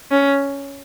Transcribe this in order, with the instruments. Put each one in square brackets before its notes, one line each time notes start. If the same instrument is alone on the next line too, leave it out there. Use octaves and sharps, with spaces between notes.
[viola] C#4